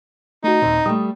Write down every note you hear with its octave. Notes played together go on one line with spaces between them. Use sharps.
A3 D#4 F#4
D#2 A#2 C4
G3 A3 D#6